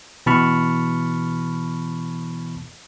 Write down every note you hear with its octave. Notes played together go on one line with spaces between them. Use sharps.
B2 E3 A5 B5 C#6 F6